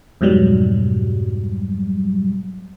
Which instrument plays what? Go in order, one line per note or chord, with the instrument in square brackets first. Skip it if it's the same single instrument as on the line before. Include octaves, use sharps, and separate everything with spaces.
[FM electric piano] F2 G#2 B2 F#3 G3